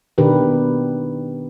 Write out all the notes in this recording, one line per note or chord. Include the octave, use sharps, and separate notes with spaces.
B2 D#3 D4 G4 A#4 B4